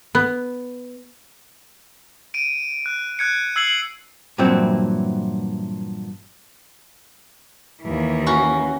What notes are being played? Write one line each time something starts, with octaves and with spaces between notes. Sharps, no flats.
B3
D7 D#7
F#6
F#6 G#6 C#7
E6 G#6 C7 C#7 F#7
G2 A#2 E3 F#3 C4 E4
D#2 E3
C#4 F#4